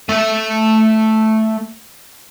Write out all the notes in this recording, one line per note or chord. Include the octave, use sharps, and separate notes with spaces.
A3 E5